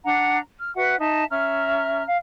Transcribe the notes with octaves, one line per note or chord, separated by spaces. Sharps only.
D4 F#5 A#5
F6
F#4 B4 E5 F#5
D#4 D#5 E5 A5
C#4 E5 A#5 F6
F5